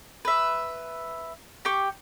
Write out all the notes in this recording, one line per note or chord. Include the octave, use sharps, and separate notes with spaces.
B4 E5
G4 G5 C#6